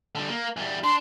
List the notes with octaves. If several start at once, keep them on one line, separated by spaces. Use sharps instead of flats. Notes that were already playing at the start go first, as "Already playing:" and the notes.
D3 G3
A#3
E2 G3
D4 C6